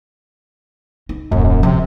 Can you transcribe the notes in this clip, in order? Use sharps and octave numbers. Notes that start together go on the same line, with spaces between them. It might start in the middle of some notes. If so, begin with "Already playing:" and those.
D#4
D#1 G#1 F#2
F#2
C3 F3